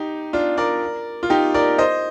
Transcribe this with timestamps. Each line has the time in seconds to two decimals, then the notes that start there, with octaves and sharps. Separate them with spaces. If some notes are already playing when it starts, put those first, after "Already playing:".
Already playing: D#4 G4
0.33 D4 F4
0.58 A#4 D5
1.23 F4
1.30 D#4 G4
1.54 A#4 D5
1.78 C5 D#5